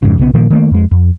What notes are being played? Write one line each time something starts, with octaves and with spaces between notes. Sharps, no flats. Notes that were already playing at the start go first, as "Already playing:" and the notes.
F2 G#2 C#3
B1 C#3 G3 B3
A#2 D#3 F3 A#3
D#3 A3 A#3
F2 G#3
F2